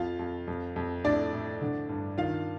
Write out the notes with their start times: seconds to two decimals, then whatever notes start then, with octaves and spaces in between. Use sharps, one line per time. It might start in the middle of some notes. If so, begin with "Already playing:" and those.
Already playing: F2 F4 F5
0.19 F2
0.48 F2
0.76 F2
1.04 A2 D4 D5
1.33 A2
1.62 D3
1.89 G2
2.18 D#3 F4 F5